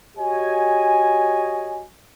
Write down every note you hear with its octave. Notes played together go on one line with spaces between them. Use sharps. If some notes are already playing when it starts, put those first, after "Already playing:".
F#4 G4 C#5 D#5 G#5